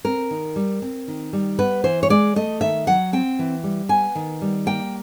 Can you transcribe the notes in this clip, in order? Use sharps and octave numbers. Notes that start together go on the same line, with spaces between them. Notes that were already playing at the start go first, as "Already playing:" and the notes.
C4 A#4
D#3
G3
C4
D#3
G3
B3 B4
E3 C5
C#5
G#3 D5
A3 D#5
D#3 E5
F#3 F#5
C4 G5
E3
G3
B3 G#5
D#3
G3
A#3 G5